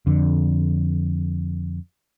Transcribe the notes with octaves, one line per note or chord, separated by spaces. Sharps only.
F2 D3